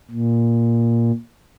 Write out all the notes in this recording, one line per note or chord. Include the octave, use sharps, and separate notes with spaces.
A#2